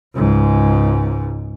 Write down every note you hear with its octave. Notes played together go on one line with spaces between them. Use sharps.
C#2 G#2